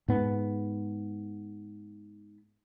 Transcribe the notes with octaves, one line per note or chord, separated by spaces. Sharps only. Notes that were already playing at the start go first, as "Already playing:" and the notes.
G#2 B3